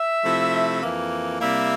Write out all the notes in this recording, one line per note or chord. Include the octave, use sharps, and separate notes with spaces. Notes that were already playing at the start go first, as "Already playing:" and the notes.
Already playing: E5
C3 F3 A3 E4
F2 E3 A#3
C3 G3 A#3 E4 E5